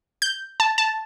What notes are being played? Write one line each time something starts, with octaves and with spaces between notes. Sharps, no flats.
G6
A5
A5